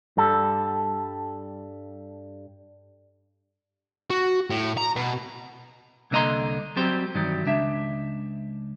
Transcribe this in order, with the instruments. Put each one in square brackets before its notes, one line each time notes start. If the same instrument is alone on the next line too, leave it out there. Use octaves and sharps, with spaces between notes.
[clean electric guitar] G2 G3 A4
[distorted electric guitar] F#4
A2
A#5
B2
[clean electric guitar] C2 D3 A#3 D#5 A#5 C6
F#3 G3 C4 G4 C5
G2 D#3 E3 F#3 G3
C#2 D4 E5